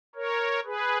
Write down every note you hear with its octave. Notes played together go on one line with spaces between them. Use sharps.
A#4 C#5
G#4 B4